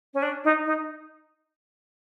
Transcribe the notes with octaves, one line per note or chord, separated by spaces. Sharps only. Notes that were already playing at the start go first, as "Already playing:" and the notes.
C#4
D4
D#4
D#4